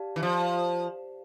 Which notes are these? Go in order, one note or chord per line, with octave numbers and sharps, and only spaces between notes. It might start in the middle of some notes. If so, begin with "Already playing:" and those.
Already playing: G4 D5 F5 A5
E3
F3